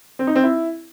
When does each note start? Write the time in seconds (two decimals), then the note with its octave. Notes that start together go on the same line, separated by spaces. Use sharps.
0.19 C4
0.27 D#4
0.35 C4
0.44 E4